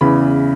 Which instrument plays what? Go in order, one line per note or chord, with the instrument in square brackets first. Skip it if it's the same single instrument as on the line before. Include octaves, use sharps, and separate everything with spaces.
[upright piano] E2 C#3 E3 B5